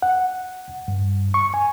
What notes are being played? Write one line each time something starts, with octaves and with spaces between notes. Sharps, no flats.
F#5
G2
C#6
G#5